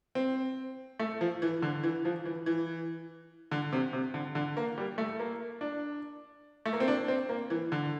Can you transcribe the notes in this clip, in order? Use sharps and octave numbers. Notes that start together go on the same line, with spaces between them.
C4
A3
F3
E3
D3
E3
F3
E3
E3
D3
C3
C3
D3
D3
A#3
G3
A3
A#3
D4
A3
A#3
C4
D4
C4
A#3
E3
D3